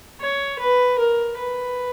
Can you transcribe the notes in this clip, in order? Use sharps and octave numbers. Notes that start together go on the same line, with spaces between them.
C#5
B4
A#4
B4